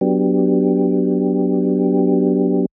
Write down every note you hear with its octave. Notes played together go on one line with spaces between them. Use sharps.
F#3 B3 D4 G4